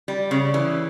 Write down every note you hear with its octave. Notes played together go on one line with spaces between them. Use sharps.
G3
C#3
E3